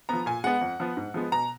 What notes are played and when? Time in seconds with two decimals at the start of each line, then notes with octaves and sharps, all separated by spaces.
0.09 F3 B3 A#5
0.26 A#2 G#5
0.44 G#3 B3 F#5
0.61 F2
0.80 F3 B3
0.97 G#2
1.14 F3 G#3 B3
1.32 B2 A#5